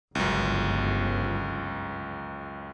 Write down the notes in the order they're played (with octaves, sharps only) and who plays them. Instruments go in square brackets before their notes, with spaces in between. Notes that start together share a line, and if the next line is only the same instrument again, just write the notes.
[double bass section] G1 [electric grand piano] C#2 F#2